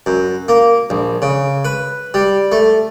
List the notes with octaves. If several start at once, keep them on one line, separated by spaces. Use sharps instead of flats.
F#2
A#3
A#1
C#3
B4
G3
A3